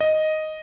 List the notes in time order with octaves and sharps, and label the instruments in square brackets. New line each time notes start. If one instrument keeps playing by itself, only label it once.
[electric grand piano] D#5